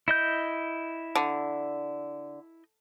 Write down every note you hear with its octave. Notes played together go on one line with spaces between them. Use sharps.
E4 D#5 G6
D3